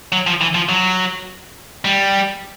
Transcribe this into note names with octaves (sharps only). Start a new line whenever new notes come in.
F#3
F3
E3
F3
F#3
G3